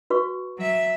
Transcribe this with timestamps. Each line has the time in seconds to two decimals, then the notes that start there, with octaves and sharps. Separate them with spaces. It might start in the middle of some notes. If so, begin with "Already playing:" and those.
0.10 F#4 B4 C#6
0.57 F#3 E5